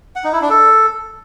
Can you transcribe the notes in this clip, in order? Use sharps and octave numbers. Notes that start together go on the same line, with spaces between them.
F#5
D#4
E4
D4
A4